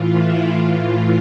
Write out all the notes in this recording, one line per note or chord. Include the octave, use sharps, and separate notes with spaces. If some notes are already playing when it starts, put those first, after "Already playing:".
Already playing: A2 E3 F4
E4
A2 E3 F4